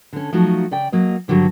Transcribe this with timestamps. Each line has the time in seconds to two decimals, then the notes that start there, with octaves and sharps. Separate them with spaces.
0.13 D3 C#4
0.33 F3 F#3 A3 D#4 F#4
0.71 C#3 D5 G5
0.92 F#3 A#3 D#5
1.28 G2 D3 D#3 F#3 G3